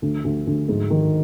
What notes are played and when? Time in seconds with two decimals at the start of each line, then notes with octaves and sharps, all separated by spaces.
0.02 D2
0.24 D2
0.47 D2
0.69 G#2
0.90 D#3